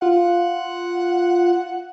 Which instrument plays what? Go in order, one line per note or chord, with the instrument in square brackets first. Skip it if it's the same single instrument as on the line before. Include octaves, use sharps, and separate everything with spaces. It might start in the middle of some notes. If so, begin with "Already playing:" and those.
[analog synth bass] F4 [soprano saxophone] F#5